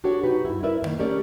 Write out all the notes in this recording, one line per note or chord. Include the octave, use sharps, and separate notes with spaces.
D4 F#4 G4 A4 C#5
D#4 F#4 G4 B4
G2 E4
E4 A#4 B4 D5 E5
A2 D#3 A#3
A3 C#4 G4 A#4 C#5 D5